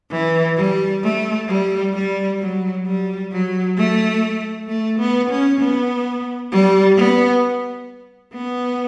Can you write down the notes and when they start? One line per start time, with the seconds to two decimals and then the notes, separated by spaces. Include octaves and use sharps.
0.11 E3
0.56 G3
1.03 A3
1.48 G3
1.94 G3
2.40 F#3
2.85 G3
3.32 F#3
3.77 A3
4.68 A3
4.99 B3
5.30 C#4
5.60 B3
6.52 G3
6.96 B3
8.33 B3